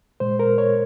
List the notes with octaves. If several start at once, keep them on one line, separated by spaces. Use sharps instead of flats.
A#2 G#3 C5
A#4
C#5